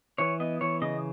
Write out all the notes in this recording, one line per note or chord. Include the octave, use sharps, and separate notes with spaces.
E3 C#5
B3 D#5
E3 C#5
C#3 D#5